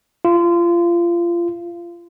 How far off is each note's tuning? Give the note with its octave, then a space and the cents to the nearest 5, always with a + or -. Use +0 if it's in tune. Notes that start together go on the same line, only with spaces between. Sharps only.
F4 -25